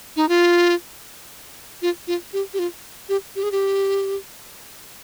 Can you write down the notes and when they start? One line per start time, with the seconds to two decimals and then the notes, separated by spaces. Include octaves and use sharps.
0.16 D#4
0.29 F4
1.82 F4
2.07 F4
2.33 G4
2.54 G4
2.59 F4
3.09 G4
3.36 G4
3.43 G#4
3.52 G4